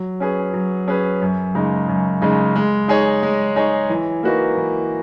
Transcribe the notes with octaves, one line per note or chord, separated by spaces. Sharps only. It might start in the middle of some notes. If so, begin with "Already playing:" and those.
Already playing: F#3
C#4 G#4 B4
F#3
C#4 G#4 B4
F#2
C#3 G#3 D#4
F#2
C#3 G#3 D#4
G#3
D#4 G#4 C#5
G#3
D#4 G#4 C#5
E3
A#3 D#4 F#4 B4
E3